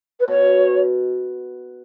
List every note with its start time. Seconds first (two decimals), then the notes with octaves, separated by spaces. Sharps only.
0.20 B4
0.28 B2 C#5